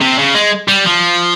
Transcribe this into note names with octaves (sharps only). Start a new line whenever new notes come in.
C3
C#3
G#3
G3
F3